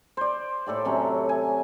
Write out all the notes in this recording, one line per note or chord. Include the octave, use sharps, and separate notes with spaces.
C5 D5
A2 A4 D5 G5
C3 F#3 C#4
G#5